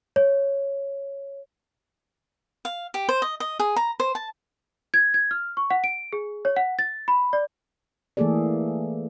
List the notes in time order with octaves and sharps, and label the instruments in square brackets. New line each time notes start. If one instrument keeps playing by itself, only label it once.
[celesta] C#5
[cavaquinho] F5
G4
C5
D#5
D#5
G#4
A#5
C5
A5
[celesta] G#6
G#6
F6
C#6
F#5
D7
G#4
C#5
F#5
A6
B5
D5
[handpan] E3 A3 A#3 G#4 A4 D5